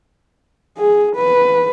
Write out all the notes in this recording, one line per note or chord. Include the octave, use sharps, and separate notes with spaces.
G#4
B4